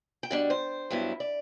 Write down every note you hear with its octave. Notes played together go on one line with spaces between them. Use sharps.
G5
B2 G3 D4 F#5
C5
G2 F#3 B3 E4
D5